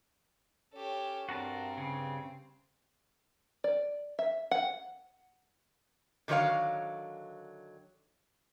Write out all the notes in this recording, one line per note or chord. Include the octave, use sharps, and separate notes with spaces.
C#4 G4 A4 C#5
G2 C4 F#4 A#4 A5
C#3
D5
E5
F#5
D3 D#3 F#3 B4 C#5 F5